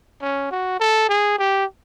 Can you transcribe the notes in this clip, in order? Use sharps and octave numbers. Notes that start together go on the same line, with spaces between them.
C#4
F#4
A4
G#4
G4